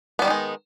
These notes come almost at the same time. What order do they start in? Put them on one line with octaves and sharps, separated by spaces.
B3 G3 D#3 D#4 G#3